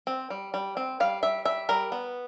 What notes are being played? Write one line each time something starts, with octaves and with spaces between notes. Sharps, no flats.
C4
G3
G3
C4
G3 F5
G3 E5
G3 E5
G3 A#4
B3